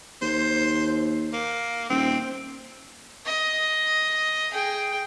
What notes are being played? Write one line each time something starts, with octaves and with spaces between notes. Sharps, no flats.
D#2 C5
A#3
D#1 C4
D#5
G#4 G5